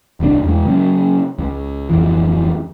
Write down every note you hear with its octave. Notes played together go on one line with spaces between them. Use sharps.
D#1 C2 A2 D4
E2 G#3
C#3 F#3 A#3 C#4
C#2
D1 F2 E3